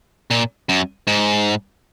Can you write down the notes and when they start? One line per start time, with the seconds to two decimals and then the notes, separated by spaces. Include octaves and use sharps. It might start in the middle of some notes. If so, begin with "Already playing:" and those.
0.31 A#2
0.69 F#2
1.07 G#2